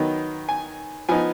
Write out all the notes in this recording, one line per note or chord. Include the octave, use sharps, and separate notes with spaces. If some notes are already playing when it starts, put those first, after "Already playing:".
Already playing: D#3 F#3 B3 D#4
G#5
F3 B3 D#4 G#5